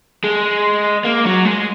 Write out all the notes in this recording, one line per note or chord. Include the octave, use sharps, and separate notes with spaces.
G#3
A#3
F#3
G#3